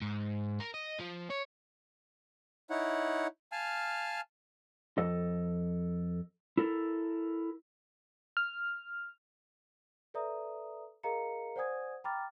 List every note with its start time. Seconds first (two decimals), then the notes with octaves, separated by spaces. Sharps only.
0.02 G#2
0.60 A#4
0.74 D#5
0.99 F3
1.30 C#5
2.70 D#4 E4 C#5 F#5
3.52 F5 G#5 A5 F6
4.98 F2 A4 D#5
6.58 E4 A4 A#4
8.37 F6
10.14 A4 B4 D5 E5 A#5 D#6
11.03 G#4 A#4 D#5 F5 A#5 C#7
11.56 C5 D5 F#5 G#5 D#6 G#6
12.04 G5 A#5 B5 D6 F6 A6